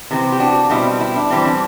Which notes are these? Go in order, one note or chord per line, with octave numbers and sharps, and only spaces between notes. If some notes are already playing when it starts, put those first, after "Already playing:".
C3 E3 A3 C4
G4
D4 F#4
B2 G3 C4 E4
E4
D4
E3 G3 C4 E4
D4